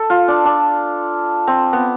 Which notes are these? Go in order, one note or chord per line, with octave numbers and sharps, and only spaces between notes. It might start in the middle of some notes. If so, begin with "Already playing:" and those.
Already playing: A4
F4
D4
D4
C4
B3